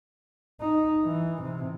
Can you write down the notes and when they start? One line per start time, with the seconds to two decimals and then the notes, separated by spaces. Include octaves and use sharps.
0.61 D#4
1.05 E3
1.42 C3